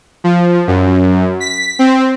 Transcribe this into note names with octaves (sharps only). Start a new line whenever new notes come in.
F3
F#2
B6
C4